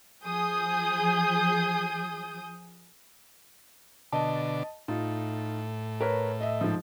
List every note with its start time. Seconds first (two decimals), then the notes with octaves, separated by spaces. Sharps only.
0.24 F3 G#4 D#6 G6
4.12 B2 D3 D4 D#5 A5
4.88 A2 D#4 F4
6.01 A#4 B4 C#5
6.41 D#5 E5
6.61 G#2 F3